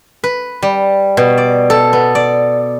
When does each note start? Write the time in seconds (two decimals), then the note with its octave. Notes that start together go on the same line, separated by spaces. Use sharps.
0.24 B4
0.62 G3
1.17 B2
1.38 D5
1.70 A4
1.93 B3
2.15 D5